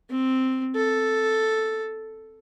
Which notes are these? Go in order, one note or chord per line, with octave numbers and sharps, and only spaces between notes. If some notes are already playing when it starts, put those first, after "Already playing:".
C4
A4